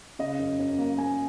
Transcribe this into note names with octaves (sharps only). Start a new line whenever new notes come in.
C#3 D#5
F#2
F#2
A#3
A#3 G#5